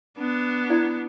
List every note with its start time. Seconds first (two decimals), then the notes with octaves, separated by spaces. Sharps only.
0.18 B3 D4
0.70 E4 D5